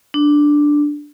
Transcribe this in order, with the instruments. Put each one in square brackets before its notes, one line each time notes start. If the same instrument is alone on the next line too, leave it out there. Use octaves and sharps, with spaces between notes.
[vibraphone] D4